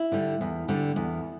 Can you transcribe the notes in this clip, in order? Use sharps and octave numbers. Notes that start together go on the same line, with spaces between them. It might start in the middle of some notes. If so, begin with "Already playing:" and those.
Already playing: E4
D3 G3
E2
D3 G3
E2